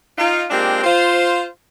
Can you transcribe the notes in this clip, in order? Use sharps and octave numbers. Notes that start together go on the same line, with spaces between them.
D#4 F4
G#3 A#3 C4 D4 F4 G4
F4 C5